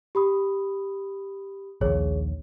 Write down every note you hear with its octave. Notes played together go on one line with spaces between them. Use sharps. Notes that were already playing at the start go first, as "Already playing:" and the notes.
G4 B5 D#6
A#1 D#2 G#4 C#5